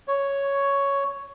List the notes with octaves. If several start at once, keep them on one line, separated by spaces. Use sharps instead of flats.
C#5